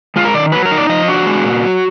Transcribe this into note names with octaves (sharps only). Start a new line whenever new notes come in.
G#3 F4
A#4
D#3 D5
F#3 B4
A#4
D#4
D5
F3 D#5
D4 F#4
G#3
A#2
F#3